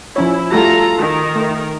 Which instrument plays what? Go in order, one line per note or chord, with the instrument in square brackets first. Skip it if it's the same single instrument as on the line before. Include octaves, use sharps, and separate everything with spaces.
[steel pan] F3 C#4 C#5 [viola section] E4
[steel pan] G3 A3 F#4 [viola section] F4 A4 A#5
[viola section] D#3 A#4
[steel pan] A3